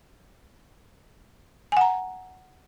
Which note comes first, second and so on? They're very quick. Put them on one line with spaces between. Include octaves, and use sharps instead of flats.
G#5 F#5 A#5